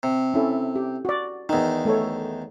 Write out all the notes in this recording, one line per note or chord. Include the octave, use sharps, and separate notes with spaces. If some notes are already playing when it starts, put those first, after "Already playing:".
C3
C#4 E4 A4
G4
F#4 D5
E2 D#3 D#4
A3 A4 C#5